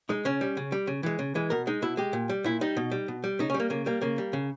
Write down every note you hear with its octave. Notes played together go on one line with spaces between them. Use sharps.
G#3 D#4
C#3 C#4
G3
C#3
G3
C#3
E3 G#3
C#3
E3 G#3
B2 A#4
G#3 D#4
B2 E4
G#3 G4
A#2
G3
A#2 E4
G3 D#4
B2
G3
B2
G3
C#3 D#4
C#4
G3
A#3
C#3 A#3
G3 A#3
C#3 A#3
G3
C#3